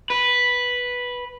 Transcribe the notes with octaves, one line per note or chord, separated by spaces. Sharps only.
B4